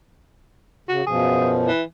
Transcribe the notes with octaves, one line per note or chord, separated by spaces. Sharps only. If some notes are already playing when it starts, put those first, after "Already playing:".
C#3 F#4
F#2 B2 F3 G#4
E3